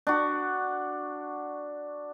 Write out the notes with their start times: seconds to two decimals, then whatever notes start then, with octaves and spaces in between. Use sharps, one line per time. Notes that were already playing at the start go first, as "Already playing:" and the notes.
0.07 D4 F#4